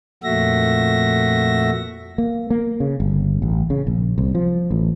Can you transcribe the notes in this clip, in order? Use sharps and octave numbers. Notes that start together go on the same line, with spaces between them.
F2 A#2 A3 F#4 E5 A#6
A#3
A#3
C#3
G1
A1
C#3
A#1
C2
F3
A1